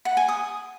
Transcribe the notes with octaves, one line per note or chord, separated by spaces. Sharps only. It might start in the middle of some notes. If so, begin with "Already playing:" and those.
F#5
G#5
D#6